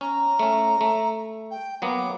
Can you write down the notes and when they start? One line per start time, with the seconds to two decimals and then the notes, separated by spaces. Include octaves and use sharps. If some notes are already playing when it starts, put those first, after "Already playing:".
0.01 C#4 A#5
0.39 A3 C#4
0.81 A3
1.50 G5
1.82 F#3 A#3 B3 D6